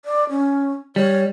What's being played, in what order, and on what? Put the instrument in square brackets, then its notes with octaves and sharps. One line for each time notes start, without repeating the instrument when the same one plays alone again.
[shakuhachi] D5
C#4
[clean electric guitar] G3 [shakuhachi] C#5